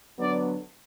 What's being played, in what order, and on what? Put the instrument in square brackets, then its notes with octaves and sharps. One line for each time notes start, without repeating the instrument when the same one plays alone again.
[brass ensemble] D3 F#3 B3 D4 D5